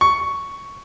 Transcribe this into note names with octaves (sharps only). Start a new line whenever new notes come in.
C#6